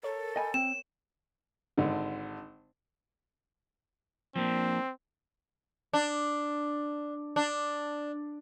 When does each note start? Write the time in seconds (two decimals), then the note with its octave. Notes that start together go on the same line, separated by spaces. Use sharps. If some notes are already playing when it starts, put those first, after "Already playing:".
0.03 A4 A#4 C#5
0.36 D#5 G5 G#5 B5
0.54 C4 E7
1.78 G#1 D3
4.36 F3 A#3 C4 D4
5.93 D4
7.36 D4